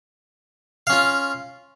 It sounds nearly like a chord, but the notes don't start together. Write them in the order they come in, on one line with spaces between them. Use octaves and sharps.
F5 C#4 F4